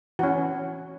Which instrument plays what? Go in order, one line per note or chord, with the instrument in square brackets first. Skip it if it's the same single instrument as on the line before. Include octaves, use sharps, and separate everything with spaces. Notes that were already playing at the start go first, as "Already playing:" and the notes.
[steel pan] E3 C#4 F#4